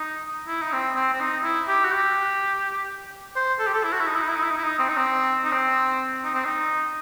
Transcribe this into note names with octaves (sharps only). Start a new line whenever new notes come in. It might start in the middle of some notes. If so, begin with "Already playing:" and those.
Already playing: D#4
E4
D#4
C4
C4
C4
D#4
E4
G4
F#4
G4
C5
A4
G4
A4
E4
F#4
E4
D#4
E4
D#4
E4
D#4
E4
D#4
E4
D#4
C4
D#4
C4
D#4
C4
D#4
C4
D#4